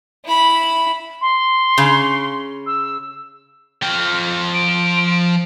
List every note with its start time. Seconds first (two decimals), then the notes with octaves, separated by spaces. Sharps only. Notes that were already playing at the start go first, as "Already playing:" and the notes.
0.25 E4 B5
1.21 C6
1.78 C#3
2.66 E6
3.83 F3 G5 F6
4.54 D7